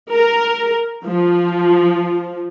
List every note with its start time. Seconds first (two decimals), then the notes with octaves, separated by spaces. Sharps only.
0.13 A#4
1.05 F3